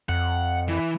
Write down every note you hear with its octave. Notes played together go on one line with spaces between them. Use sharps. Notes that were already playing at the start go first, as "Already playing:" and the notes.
F2 F#5
E3